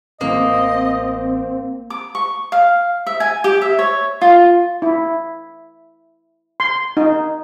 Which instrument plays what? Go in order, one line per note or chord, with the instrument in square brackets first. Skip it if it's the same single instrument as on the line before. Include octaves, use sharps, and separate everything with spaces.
[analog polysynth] A1 [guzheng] A#3 [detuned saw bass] C4 [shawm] D#5
[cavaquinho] D6
C#6
F5
E5
G#5
G4
E5
C#5
F4
[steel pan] E4
C6
D#4